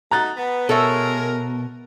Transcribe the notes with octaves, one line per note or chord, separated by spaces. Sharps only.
A3 D#4 F#4 A#5 F#6 A6
B3
B2 G#3 A4 A#4 C#5 E5